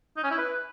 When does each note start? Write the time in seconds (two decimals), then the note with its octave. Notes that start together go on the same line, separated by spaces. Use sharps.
0.17 D#4
0.24 C#4
0.31 E4
0.38 B4